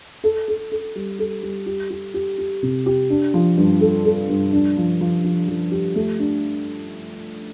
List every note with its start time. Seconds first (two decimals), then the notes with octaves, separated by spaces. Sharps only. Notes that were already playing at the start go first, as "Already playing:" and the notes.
0.24 A4
0.48 A4
0.72 A4
0.95 G3
1.19 A4
1.43 G3
1.66 G4
1.90 G4
2.14 G4
2.38 G4
2.63 C3
2.86 G4
3.10 D4
3.34 F3
3.57 G2
3.81 A4
4.05 A4
4.29 G2
4.53 D4
4.77 F3
5.01 F3
5.24 F3
5.48 F3
5.71 G4
5.95 A3
6.19 D4